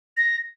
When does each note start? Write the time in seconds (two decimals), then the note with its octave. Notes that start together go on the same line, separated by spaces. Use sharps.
0.17 A#6